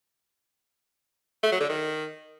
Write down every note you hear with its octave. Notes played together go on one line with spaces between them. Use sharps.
A3
F#3
D3
D#3